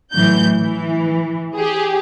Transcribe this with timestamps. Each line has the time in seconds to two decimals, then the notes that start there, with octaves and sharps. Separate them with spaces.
0.13 A2 E3 F#3 G6
0.60 E3
1.55 G4 G#4